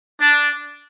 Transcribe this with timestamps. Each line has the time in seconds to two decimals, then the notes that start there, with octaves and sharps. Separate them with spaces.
0.21 D4